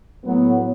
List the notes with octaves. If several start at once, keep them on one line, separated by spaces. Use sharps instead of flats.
A2 F#3 B3